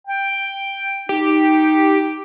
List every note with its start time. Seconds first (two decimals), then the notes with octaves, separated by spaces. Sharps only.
0.07 G5
1.09 D#4 G4